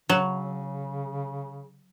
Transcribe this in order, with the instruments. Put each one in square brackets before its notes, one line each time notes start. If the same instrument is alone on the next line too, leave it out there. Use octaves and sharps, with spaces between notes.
[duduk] C#3 [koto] F#3